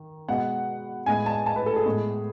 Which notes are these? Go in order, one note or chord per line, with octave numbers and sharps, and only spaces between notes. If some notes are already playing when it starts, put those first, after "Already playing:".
Already playing: D#3
B2 G#3 B3 F#5
A2 G#3 B3 G#5
A5
A5
B4
A4
G#4
A2 G#3 B3